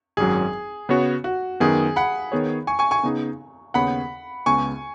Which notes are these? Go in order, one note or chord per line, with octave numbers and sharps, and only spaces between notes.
G#1 F#2 F#3 G#4
C#3 B3 F#4 C#5
F#4
F#2 D#3 B3 G#4
F#5 B5
D#3 B3 G#4 C#5
G#5 C#6
G#5 C#6
G#5 C#6
C#3 B3 D#4 G#4
D#2 C#3 B3 G#4 C#5 F#5 B5
C#2 C#3 B3 G#5 C#6